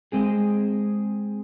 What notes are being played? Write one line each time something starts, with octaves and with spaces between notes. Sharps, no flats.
G#3 C4 G#4